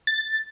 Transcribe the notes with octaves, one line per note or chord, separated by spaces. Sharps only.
A6